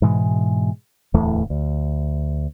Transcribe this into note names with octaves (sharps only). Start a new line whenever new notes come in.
G#2 B2 E3 G#3
D1 E2 E3 A3
D2